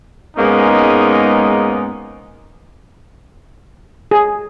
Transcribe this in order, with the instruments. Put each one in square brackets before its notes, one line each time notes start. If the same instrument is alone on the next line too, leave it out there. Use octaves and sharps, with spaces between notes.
[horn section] G#2 G#3 A#3 B3 C#4 D#4
[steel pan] G#4